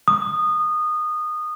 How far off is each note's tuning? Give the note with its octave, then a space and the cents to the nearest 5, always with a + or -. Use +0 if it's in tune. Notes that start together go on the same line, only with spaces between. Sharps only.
D#6 -20